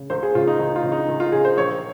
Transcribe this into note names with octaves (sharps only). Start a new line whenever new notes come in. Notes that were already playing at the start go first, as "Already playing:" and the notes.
Already playing: C#3
C#2 C5
G#4
C#3 F4
D#4
C#2 D#4
F4
C#3
D#4
C#2
F4
C#3 G#4
C5
A#1 C#5